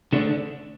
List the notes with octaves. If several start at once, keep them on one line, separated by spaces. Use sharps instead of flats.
D3 A3 D4